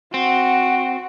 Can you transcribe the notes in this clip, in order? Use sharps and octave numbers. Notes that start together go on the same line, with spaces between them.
C4 F#4